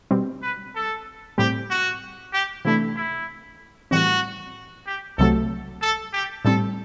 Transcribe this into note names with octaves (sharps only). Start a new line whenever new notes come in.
B2 G3 C4
B4
A4
A2 G3 C4 G4
F#4
G4
C3 E3 A3 D4 E4
E4
A2 E3 G3 C4 F#4
G4
C2 C3 F#3 A3 A4
A4
G4
A2 G3 C4 A4